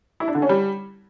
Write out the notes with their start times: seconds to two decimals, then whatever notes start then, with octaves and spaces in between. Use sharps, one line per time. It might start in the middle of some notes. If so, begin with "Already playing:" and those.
0.20 E4
0.28 D4
0.35 D3
0.42 C#4
0.49 G3